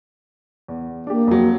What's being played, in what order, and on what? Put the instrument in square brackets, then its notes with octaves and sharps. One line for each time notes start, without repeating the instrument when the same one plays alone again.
[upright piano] E2
[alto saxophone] A#3 [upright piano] D4 G4
[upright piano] F2 F#3